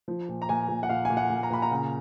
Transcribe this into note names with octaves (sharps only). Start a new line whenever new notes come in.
F3
A#2
A#5
A#2 G#5
A#2
F#5
A#2 F5
A#2 G#5
F#5
A#2
A#5
A#2 B5
A#5
C#3